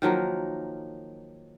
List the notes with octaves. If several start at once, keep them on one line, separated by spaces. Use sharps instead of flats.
D#3 F3 F#3 A#3